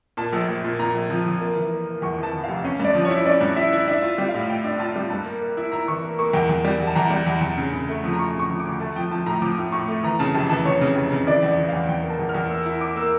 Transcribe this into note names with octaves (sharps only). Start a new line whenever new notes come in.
A#2 A5
A#1
A#1
A#2
A#2 A#5
A#1
F3
F3
A#3
E3
A#3
A#3
E2 C#6
E3 A5
E3
F1 F5
C#4 F5
G2
D5
F3
C#5
E4
C#4 D5
G2
E4 E5
E4
D4 E5
F4
G3
F5
A2
F4 G5
D4
F4 A5
G3
G2 A5
A#3
A#3
E4
E4 A#5
E3 C#6
A#3
A#3 C#6
E2 G5
E2
G3
E2
A5
E2 A#5
G3
E2
E2
C#3
C#3
A3
F3
A#5
A3 C#6
C#3 C#6
F3
D6
D2
A3 A5
F3 G5
F3 A5
A2 A#5
F3 D6
A2
A2 C#6
A3
E3 A#5
C#3 A5
F1 A5
E3 A5
E3 C#5
C#3
F1
C#3
E3 D5
E2
D5
E3
E2 F5
E2 G5
A#3
A5
E2
F6
E2
A#3 E6
E4
E4 D6
A#3 E6